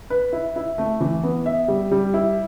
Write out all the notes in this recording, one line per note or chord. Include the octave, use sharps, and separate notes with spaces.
B4
E4
E4
A3
E3
B3
E5
G3
G3
E4